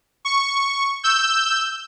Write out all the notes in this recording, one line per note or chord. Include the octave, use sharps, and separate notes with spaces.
C#6
E6 G6